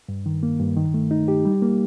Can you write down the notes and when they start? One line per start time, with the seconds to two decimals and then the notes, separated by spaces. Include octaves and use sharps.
0.09 G2
0.26 D#3
0.43 A#3
0.60 G2
0.77 D#3
0.94 A3
1.11 D#4
1.28 G4
1.45 G3
1.62 A#3